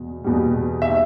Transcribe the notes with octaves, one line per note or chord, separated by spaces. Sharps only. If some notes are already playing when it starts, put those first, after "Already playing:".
Already playing: E2 B2
E2 B2 G3
E5